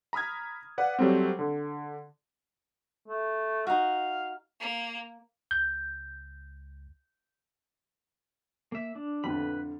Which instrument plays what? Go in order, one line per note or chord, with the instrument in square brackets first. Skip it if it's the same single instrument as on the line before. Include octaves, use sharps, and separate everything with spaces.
[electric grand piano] A#5 B5 D#6 F6 G#6
B4 D5 F5 F#5
F#3 G3 A3 C4
D3
[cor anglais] A3
[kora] D#4 F#4 [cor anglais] F5
[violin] A#3
[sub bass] C#2 [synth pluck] G6
[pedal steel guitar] A#3 E5
D4
[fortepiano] F2 A2 D3 [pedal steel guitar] B4 B5